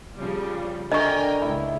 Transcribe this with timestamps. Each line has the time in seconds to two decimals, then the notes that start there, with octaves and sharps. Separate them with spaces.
0.17 C#3 F3 G3
0.92 D3 A#4 D#5 G5 G#5 C#6
1.41 C#2 E4